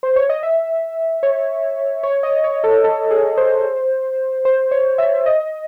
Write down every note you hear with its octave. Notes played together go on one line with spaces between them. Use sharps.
C5
C#5
D#5
E5
C#5
C#5
D#5
C#5
A4
A4
G#4
C5
C5
C#5
E5
D#5